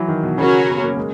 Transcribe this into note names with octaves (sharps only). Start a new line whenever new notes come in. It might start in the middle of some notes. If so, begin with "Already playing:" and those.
Already playing: E3 F#3
D#3
B2
C#3 F#3 C#4 F#4 A#4
B3
A#3
G#3